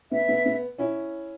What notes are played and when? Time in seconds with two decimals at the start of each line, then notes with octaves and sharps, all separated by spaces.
0.11 B3 E5
0.28 B3
0.46 B3
0.78 C#4 E4